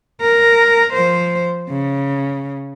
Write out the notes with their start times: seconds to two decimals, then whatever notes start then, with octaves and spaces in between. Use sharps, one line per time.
0.22 A#4
0.93 F3 C5
1.69 C#3